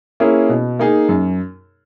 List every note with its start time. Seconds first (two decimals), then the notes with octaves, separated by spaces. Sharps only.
0.20 A#3 C#4 E4 G#4
0.49 B2
0.79 A#3 D#4 G#4
1.09 F#2